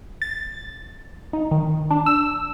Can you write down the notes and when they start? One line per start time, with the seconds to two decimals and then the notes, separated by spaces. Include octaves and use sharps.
0.22 A6
1.33 D#4
1.51 D#3
1.91 D4
2.06 E6